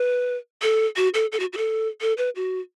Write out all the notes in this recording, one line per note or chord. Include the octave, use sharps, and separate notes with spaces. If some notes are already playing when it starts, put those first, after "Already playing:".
Already playing: B4
A4
F#4
A4
A4
F#4
F#4
A4
A4
B4
F#4